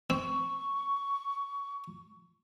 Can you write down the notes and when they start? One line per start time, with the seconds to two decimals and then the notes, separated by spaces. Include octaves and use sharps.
0.10 C4 C#6